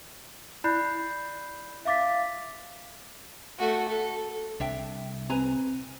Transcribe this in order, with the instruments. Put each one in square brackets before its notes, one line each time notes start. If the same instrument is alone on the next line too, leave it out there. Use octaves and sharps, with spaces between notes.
[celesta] E4 D5 B5 F#6 G6 C7
E5 F5 D6 A6 B6
[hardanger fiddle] A3 F#4
A4
[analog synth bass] C2 [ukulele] D4 E5 G5
[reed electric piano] C4 [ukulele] B4 G#5 A#5